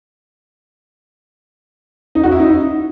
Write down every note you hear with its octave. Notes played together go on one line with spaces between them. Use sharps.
D#4
F#4
E4
D#4